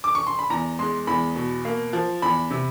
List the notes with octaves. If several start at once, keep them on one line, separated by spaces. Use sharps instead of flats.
D6
C#6
C6
B5
E2 A#5
G#3 C6
E2 B5
B2
A#3
F3
E2 B5
C3